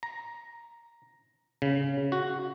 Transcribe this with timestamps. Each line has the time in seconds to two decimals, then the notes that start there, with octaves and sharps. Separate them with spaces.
0.03 A#5
1.62 C#3
2.12 F#4